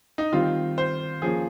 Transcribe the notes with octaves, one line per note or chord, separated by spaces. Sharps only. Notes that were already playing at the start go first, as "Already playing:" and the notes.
D#4
D#3 G3 C4 F4
C5
F3 A#3 C#4 G#4